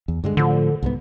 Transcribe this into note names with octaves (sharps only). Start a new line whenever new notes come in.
E2
G2 D3 G#3
A2 D3 F3
C2 G#2 B3